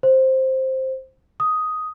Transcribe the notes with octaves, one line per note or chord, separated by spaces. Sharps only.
C5
D#6